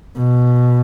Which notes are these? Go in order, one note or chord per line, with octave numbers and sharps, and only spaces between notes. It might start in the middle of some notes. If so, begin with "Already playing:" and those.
B2